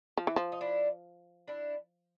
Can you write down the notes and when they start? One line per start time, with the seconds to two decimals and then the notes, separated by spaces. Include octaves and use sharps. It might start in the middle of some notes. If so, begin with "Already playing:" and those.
0.17 F3
0.27 E3
0.36 F3
0.52 D#4
0.61 D4 E4
1.48 D4 E4